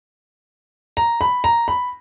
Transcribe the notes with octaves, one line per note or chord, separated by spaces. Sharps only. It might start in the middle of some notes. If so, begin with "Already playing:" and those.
A#5
B5
A#5
B5